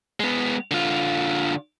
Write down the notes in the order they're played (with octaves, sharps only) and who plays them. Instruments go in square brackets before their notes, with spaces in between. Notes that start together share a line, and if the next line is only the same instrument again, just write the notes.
[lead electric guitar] G#3 B3
D3 F4